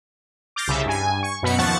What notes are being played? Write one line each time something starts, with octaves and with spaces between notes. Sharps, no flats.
D6 F6 G6 A6 A#6 C7
C2 C#3 E5
G2 G#5
C#6
F#2 B2 B3 B5 C#7
D#2 F3 F#5 A5 C#6 A6